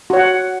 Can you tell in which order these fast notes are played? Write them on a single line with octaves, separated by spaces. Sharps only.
F#4 C#5 F#5